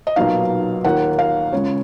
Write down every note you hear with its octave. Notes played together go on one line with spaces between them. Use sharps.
D#5
B1 A#2 F#3 B3 D#4 F5
D#2 D#3 A#3 F4 F#5
F5
C#2 C#3 G#3 C#5